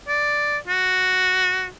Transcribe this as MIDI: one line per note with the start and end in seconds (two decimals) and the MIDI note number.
0.08 0.58 74
0.68 1.67 66